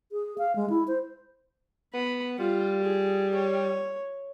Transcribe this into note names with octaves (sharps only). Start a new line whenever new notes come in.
G#4
F5
G#3
E4
C5
B3 B5
G3 F4
G#4
C#5